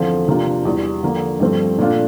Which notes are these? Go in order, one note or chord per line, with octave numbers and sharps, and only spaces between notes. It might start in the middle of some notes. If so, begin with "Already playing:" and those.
Already playing: E2 D3 F3 C4 F4
C3 F3 A#3 D4 F4
E2 E3 G3
D3 F3 A#3
G2 F3 A3 C4
A#2 A3 D4 F4